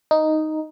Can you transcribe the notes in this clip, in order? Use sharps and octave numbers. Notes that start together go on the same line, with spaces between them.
D#4